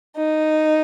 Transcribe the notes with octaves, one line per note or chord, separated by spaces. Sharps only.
D#4